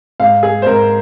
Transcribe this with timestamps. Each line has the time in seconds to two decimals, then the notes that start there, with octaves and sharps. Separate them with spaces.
0.20 G#2 F5
0.43 G#4
0.62 C5
0.66 G#2 A#4